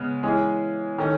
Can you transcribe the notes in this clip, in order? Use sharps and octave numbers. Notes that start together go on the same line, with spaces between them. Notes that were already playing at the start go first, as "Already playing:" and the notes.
Already playing: C#3 G#3 B3
E3 G#3 C#4 G#4
D#3 A3 C#4